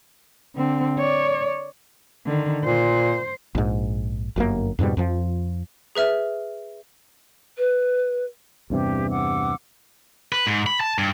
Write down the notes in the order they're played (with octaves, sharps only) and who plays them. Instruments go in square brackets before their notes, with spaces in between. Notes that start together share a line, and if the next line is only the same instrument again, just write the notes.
[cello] D3 C4
C#5 D5
D3 D#3
[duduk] A#2 [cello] C5
[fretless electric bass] A#1 G#2
G1 F#2 A#2 A#3
F2 G#2 B2 G3
F2 F3
[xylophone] G#4 B4 E5 F6
[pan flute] B4
[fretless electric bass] E2 G2 C3 [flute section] G4
[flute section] F#5 D6 E6
[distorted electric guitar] B4
G#2
B5
A5
G2